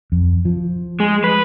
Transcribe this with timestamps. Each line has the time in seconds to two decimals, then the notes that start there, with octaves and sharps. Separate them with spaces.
0.12 F2
0.45 F3
1.00 G#3
1.24 B4